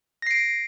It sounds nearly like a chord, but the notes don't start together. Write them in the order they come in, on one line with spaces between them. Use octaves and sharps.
A#6 C7 D7